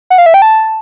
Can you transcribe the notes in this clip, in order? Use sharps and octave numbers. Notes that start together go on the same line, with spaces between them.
F#5
F5
E5
G5
A5